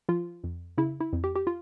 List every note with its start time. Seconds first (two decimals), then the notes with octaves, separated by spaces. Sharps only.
0.09 F3 F4
0.44 F2
0.78 C#3 E4
1.00 E4
1.13 F2
1.24 G4
1.36 G4
1.47 F4